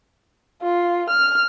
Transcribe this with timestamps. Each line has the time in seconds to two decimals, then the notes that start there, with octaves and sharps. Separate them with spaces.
0.62 F4
1.10 F6